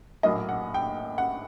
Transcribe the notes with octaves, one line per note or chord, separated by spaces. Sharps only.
A#1 A2 F#3 A#3 D#5
F#5
G5
F#5